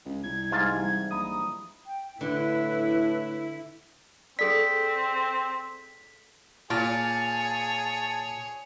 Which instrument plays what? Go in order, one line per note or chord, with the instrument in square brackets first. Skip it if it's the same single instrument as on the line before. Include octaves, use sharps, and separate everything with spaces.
[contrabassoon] C#2
[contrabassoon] C2 [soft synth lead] G#6
[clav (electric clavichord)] G#2 F4 A5 [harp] G3 D#5
[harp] E3 F3 G3
[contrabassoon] A#1 [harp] A#5 B5 C#6 [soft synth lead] D#6
[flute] G5
[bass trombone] A2 [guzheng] D3 [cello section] E4 [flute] B4
[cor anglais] C4 [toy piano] G#4 A4 D5 [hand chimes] B6
[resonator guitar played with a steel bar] A#2 [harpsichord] F4 [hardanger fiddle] G#4 C#5 [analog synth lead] A5